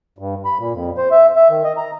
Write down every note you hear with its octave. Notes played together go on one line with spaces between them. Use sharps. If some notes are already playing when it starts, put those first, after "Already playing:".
G2
B5
A#2
F2
C5
E5
E5
D#3
D#5
A#5